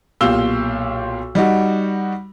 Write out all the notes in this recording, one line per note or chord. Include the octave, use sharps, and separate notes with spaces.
B1 A#2 G4 F5 E6 G7
G3 D#4 F#4